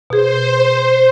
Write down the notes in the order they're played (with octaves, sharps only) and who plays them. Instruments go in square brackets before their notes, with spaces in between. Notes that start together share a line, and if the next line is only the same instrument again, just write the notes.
[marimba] B2 G#4 [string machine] C5